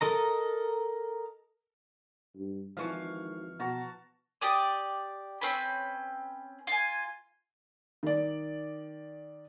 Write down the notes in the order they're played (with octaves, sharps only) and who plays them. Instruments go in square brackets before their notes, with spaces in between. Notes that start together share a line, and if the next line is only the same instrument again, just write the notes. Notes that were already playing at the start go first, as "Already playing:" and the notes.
[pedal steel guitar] A4 A#4 D#5 A#5
[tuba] G2
[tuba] G#1 [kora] E3 F3 [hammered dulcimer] F5 C#6
[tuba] B2 [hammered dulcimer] F#4 A5 A#5
[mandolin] G4 D5 D#6
C4 C#4 B4 B5
F4 G#5
[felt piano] D#3 D5